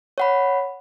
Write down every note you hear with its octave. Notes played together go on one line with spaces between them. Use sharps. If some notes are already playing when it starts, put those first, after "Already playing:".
C#5 F#5 B5